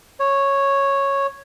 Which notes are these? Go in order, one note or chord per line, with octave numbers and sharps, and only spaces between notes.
C#5